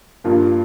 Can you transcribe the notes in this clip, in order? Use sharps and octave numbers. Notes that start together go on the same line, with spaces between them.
G2 F3 A#3 F4